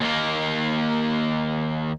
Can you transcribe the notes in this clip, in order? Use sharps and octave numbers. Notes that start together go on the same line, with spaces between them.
D#2 A#3